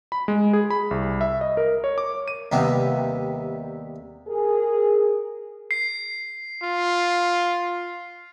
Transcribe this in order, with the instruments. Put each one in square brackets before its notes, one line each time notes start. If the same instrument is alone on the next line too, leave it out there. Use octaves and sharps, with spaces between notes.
[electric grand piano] B5
G#3
G#4
B5
C2
E5
D#5
A#4
C#5
D6
D#7
[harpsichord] D#2 C3 G3 B3
[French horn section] G#4 A#4
[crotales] C7
[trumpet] F4